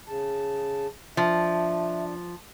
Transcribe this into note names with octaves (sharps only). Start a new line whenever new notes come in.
C#3 A5
F3 D4 E5